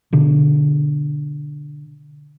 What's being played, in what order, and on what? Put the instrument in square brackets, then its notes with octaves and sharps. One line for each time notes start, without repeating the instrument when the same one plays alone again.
[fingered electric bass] B2 D3